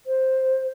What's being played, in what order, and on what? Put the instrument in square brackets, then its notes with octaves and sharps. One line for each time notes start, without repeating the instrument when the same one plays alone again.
[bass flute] C5